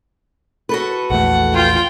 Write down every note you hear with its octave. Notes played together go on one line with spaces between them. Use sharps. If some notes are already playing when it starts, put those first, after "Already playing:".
F#4 A4 B4
A#1 E2 A3 F#5
F4 G5